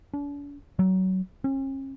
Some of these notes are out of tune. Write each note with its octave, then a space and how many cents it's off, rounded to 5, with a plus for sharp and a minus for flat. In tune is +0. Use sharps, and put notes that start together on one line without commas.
D4 -45
F#3 +20
C#4 -45